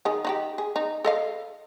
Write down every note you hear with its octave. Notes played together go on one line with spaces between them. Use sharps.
D#3 G#4
D#4 F#4 G4
G#4
D#4
A4 D#5 F5